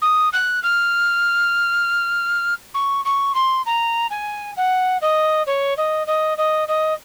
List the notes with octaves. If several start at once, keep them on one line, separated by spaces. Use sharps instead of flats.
D#6
F#6
F6
C#6
C#6
C6
A#5
G#5
F#5
D#5
C#5
D#5
D#5
D#5
D#5